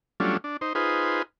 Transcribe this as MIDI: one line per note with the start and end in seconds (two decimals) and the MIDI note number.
0.20 0.37 54
0.20 0.37 55
0.20 0.37 57
0.20 0.37 61
0.20 0.37 62
0.20 0.37 65
0.44 0.57 62
0.61 0.73 63
0.61 0.73 72
0.75 1.22 63
0.75 1.22 65
0.75 1.22 68
0.75 1.22 71
0.75 1.22 72